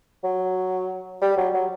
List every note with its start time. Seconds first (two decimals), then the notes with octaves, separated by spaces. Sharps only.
0.24 F#3
1.21 G3
1.37 F#3
1.54 F#3